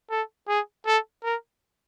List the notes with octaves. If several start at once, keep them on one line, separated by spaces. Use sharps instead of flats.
A4
G#4
A4
A#4